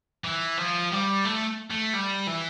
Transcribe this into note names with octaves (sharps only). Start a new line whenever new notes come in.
E3
F3
G3
A3
A3
G3
E3